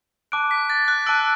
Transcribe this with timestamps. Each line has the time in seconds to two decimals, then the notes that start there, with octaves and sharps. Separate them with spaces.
0.32 A5 D6 F#6 D7
0.51 B6
0.70 A6
0.88 F#6
1.06 A5 D6 E6 F#6 D7